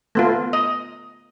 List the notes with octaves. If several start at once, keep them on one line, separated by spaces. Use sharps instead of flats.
A3 B3 F4
D#5